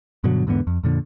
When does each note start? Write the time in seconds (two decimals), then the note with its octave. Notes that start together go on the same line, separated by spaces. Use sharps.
0.24 G2 B2 D3 F#3
0.47 E2 G#2 D3 B3
0.67 F2
0.84 F2 A#2 D3